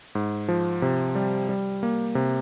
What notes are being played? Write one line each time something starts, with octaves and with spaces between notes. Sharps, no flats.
G#2
F3
C3
G3
G3
A#3
C3